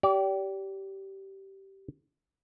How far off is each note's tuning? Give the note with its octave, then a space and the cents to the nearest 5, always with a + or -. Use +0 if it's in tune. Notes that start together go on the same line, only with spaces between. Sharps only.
G4 -15 D5 -35